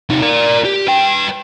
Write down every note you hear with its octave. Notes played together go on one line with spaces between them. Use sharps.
C3 D#4
A#4 D5
G4
B4 G5